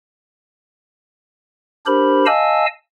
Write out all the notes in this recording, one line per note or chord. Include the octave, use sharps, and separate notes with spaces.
D4 G4 A#4 C5 B5
D#5 F5 G#5 A5 E6